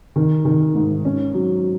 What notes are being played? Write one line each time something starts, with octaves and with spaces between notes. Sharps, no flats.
D#3
D#3
G#2
C#4
F#3